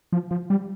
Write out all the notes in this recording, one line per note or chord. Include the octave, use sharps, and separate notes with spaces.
F3
F3
G3